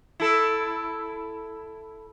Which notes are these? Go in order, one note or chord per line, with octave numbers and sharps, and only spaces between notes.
E4 A4